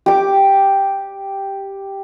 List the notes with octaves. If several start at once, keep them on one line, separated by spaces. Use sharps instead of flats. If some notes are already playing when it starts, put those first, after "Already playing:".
G4 D6